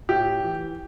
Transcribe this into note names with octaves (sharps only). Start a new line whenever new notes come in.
A2 G4
E3